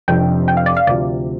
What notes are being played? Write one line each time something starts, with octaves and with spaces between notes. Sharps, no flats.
F1 F2 C3 F3 D4 G5
G5
F5
D5
F5
D2 C3 F3 D5